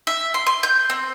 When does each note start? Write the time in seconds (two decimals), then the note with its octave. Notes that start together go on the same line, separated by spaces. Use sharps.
0.07 E5
0.34 C6
0.46 C6
0.63 G6
0.90 C4